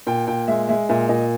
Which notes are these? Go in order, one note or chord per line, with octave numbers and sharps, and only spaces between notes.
A#2 G5
A#2 G5
G#3 E5
G#3 E5
A#2 E5
A#2 D#5